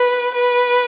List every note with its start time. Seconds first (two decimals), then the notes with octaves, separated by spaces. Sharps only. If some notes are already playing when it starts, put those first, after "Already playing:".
Already playing: B4
0.35 B4